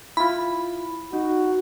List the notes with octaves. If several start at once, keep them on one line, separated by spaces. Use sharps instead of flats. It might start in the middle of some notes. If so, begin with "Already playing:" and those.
E4 F4 B5
D#4 F#4